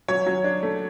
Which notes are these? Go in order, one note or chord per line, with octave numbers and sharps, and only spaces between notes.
F#3 C#5
F#3
D4
A3